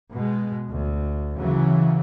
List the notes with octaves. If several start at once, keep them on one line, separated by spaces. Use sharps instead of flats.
B2 G#3
D2
C#3 E3 F#3